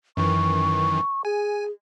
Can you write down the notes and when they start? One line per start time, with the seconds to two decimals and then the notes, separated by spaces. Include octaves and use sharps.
0.17 F#2 D#3 E3 C#6
1.25 G#4 G#5